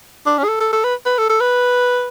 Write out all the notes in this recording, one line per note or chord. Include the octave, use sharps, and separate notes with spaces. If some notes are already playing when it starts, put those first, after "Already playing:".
D4
C#4
G#4
A4
A4
A4
B4
B4
A4
A4
B4